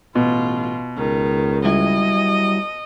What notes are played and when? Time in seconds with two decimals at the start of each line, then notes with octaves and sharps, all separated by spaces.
0.15 A1 B2 F4
0.97 C#2 D#3
1.65 F#3 G3 E4 D#5